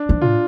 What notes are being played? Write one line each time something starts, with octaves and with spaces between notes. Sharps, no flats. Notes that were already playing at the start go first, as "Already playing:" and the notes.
Already playing: D4
F3
A2 F4